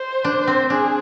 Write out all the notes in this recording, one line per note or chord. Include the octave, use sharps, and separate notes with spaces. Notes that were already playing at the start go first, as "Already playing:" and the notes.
Already playing: C5
D4
C4
D4 G#4